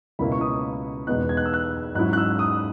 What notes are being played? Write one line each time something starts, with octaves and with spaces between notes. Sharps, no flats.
C#2 B2 A#3 C#4 E4 B5
C#6
D#6
E2 B2 G#3 B3 D#4 F#6
G#6
F#6
E6
F#6
G#2 F#3 C#4 E4 F#6
F#6
E6
D#6